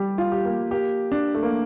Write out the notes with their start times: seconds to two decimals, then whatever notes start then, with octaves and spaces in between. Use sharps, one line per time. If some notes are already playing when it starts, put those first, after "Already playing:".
Already playing: G3 G4
0.18 F4
0.32 G4
0.45 A#3
0.71 A#3 G4
1.12 D4
1.34 A3
1.43 A#3